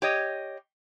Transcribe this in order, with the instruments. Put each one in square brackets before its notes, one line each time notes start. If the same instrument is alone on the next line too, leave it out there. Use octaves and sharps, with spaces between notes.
[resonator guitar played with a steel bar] G4 C#5 D#5